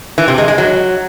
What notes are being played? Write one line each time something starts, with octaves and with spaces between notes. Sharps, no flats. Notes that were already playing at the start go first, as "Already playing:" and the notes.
E3
C3
G#3
G#3
F#3